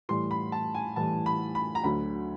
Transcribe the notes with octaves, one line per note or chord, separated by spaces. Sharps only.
A2 E3 G3 C6
B5
A5
G#5
A2 E3 G3 A5
B5
B5
A#5
D2 D3 F#3 B5